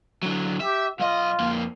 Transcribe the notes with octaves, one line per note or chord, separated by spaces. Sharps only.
D3 F#3
G4 E5
B1 F4 D#5
F2 A#3